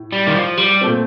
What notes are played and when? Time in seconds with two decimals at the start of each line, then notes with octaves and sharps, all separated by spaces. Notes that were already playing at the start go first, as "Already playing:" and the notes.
Already playing: A2
0.12 G3
0.27 D#3
0.35 F3
0.58 G3
0.81 A#2 A3 C4